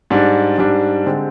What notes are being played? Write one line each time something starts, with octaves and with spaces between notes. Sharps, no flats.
G#2 G3 D4
G#2 G3 D4
D3 G#3 C4 G4